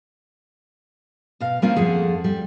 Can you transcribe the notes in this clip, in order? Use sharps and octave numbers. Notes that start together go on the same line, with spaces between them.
B2 F5
G3 A#3 C4 C#4 E4 F4
F2 G#4 A4 F#5
G3